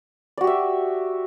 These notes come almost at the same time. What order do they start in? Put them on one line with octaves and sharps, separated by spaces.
D5 F#4 G4 E5